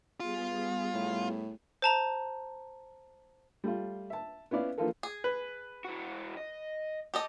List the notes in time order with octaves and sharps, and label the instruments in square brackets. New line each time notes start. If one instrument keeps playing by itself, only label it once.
[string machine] G3 B3 G#4 [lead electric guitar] F4
[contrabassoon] A2
[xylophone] C5 A5 A#5
[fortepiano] G3 A3 F4
E5 A5
B3 C#4 E4 D5 F5
E3 F3 A#3 F4 A4 A#4
[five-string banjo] G#4
[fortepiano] B4
[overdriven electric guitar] E3 F#4
D#5
[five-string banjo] G4 A4 D#5